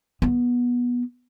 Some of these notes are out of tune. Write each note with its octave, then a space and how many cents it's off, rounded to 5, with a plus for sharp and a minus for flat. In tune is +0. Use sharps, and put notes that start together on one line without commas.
B3 -20